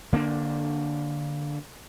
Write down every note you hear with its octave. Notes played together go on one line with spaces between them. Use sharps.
D3 A#3 B3 D4